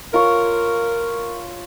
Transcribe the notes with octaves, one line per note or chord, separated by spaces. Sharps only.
F4 A#4 C#5